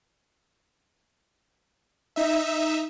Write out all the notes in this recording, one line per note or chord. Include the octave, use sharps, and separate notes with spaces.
D#4 E5